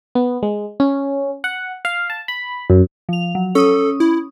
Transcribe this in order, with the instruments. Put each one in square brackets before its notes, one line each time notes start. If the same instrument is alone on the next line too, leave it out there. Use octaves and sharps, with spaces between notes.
[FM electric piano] B3
G#3
C#4
F#5
F5
A5
B5
F#2
[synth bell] F3 F7
F#3
[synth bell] C#4 D#6 [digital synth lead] A4
[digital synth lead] E4